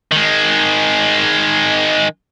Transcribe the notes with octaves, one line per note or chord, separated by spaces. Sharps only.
D#3 G#3